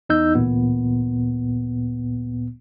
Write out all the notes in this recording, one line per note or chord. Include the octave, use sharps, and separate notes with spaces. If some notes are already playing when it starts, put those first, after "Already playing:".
E2 D#4 D#5 E6 G6
A1 D2 A#2 B3